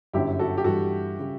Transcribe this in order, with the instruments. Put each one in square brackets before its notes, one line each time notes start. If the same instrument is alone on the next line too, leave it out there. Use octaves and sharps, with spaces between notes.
[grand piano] G1 F#2 D3 F#3 [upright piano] E4 G4
[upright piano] F#4 A4
G4
[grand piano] G2 E3 G3 [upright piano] F#4 A4
[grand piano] C#3 G3